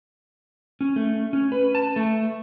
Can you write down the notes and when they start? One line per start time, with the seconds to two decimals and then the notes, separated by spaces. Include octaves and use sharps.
0.81 C#4
0.96 A3
1.33 C#4
1.52 B4
1.75 A5
1.96 A3